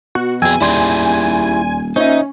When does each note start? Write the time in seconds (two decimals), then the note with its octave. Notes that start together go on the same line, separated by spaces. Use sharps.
0.15 B2 F#4
0.42 F2 G#4 G5 G#5 E6 G#6
0.61 D#1 D#2 E4 G4 G#4 D5 C6
1.96 A#2 C#4 D#4 C5 E5